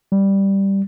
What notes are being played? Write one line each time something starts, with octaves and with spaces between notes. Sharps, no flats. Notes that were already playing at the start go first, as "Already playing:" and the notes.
G3